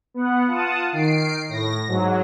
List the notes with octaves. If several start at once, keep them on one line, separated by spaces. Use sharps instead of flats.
B3 F#5
F4 F#5 A5 D#6
D#3 C7 D7
A2 A#6
G#2 F#3